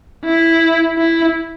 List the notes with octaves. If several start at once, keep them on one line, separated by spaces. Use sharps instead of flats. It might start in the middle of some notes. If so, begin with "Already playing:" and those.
E4
E4